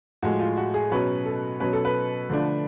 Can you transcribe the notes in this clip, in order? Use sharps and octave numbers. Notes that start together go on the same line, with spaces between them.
A2 F3 G#3 F#4
F4
F#4
G#4
B2 F#3 C#4 B4
A4
B2 F#3 C#4 B4
A4
B4
D3 F3 A3 D4